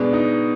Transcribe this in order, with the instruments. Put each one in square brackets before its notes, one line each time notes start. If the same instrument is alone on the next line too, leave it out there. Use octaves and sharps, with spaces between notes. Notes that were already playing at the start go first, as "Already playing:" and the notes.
Already playing: [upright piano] B2 G#3 D4 [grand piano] B3
[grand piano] D#4